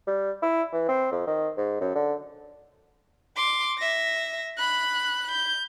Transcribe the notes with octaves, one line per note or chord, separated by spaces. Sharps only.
G3
E4
E3
C4
F2
D#3
G#2
F#2
D3
C6 D6
E5 A#6
B5 F#6
G6